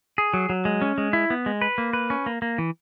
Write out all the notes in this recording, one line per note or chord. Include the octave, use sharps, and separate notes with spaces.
G#4
F#3
F#3
G#3
C#4
G#3
E4
B3
G#3
B4
A#3
B4
C#4
A#3
A#3
E3